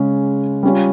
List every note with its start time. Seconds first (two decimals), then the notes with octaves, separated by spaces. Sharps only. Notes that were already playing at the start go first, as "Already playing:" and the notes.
Already playing: C#3 G#3 C#4
0.63 G3 C#4 F4